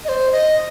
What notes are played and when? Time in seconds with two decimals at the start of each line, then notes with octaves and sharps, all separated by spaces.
0.05 D#5
0.09 C5
0.32 D#5